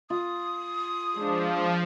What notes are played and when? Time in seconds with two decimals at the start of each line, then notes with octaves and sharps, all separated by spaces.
0.10 F4 D#6
1.15 F3 G#3 D4